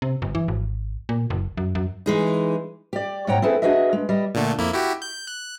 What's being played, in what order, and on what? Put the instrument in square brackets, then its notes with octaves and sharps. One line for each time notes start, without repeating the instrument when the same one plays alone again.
[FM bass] C3
G1
E3
G#1
A#2
F#1
F#2
F#2
[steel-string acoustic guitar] E3 G#3 D#4
G4 D5
G#2 B2 C#5 F#5 G5 A#5
C4 E4 G#4 A4 B4
D4 F#4 G#4 B4 D#5 E5
G#3
G3 D#5
[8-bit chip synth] A#2 D3 A3
F2 A#3 E4
E4 F#4 G4
G6
F#6